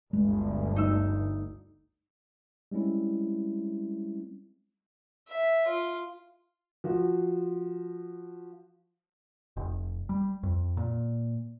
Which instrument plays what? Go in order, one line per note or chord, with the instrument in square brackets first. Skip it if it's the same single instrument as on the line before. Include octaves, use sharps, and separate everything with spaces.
[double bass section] G1 D2 [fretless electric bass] G#3
[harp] D#4 E6
[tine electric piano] G3 G#3 C4 C#4 E4
[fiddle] E5
F4
[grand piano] F3 F#4
[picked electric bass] F1
G3
F2
A#2